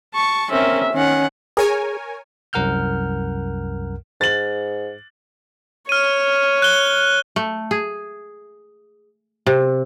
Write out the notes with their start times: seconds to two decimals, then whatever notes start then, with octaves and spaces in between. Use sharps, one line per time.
0.15 A5 C#6
0.51 C4 C#4 A#4 E5
0.94 D#3 C#4 F#5
1.57 G#4 A#4 C#5 G#5
2.53 C2 F#2 A#4 F#5 F6 G6
4.21 G#2 A6 F#7
5.89 C#5 F6 D#7
6.62 F#6 G7
7.36 A3
7.71 G#4
9.47 C3